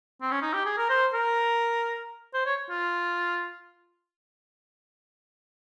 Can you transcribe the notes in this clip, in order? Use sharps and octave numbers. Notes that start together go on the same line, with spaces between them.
C4
C#4
D#4
G4
G#4
A#4
C5
A#4
C5
C#5
F4